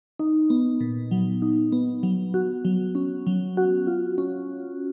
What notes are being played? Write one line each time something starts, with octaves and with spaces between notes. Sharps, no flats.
D#4
B3
A#2
F#3
D#4
B3
F#3
F#4
F#3
C#4
F#3
F#4
F4
C#4